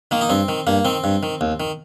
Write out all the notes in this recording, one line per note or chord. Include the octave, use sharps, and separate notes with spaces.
D#3 A#3
D#4
G2 C4
D#3
G2 A#3
D#3 C4
G2
D#3
D#2
D#3